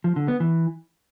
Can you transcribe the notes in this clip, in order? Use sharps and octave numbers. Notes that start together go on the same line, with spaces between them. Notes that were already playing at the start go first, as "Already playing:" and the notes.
F3
D3
B3
E3